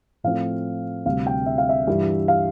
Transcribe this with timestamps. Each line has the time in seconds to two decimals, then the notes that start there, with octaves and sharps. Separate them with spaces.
0.24 A2 F3 A3 C4 F4 F5
1.06 D2 C3 G3 F5
1.27 G5
1.46 E5
1.58 F5
1.69 E5
1.87 G2 E3 G3 D4 F4
2.28 F5